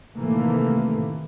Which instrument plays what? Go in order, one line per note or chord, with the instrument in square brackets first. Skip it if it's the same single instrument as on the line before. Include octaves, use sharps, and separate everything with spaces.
[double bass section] A2 C3 D#3 E3 A3 A#3